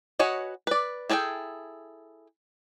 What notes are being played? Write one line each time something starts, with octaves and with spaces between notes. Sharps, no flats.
F#4 B4 C#5 D#5 G#5
B4 D5
E4 G#4 A4 D5 G5